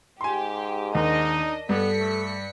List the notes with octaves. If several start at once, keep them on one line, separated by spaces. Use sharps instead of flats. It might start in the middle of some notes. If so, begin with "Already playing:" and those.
G#2 G4 G#5 C6
D#2 D4 D#4 D#5
G2 B3 A4 B6 C#7
A3